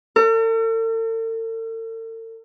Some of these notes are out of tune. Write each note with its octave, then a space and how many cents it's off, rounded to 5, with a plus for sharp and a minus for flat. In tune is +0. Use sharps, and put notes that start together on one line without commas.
A4 +45